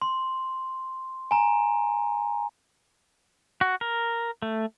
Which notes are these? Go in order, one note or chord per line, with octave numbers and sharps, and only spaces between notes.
C6
G#5 A#5
F#4
A#4
A3